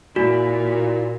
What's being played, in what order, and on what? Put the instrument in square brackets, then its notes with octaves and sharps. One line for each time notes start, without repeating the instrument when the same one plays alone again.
[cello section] A#2 [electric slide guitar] E4 D5 G#5 [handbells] F#4